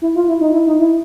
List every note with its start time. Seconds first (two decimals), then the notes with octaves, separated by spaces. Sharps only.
0.02 E4
0.16 F4
0.28 E4
0.41 D#4
0.53 E4
0.67 D#4
0.79 E4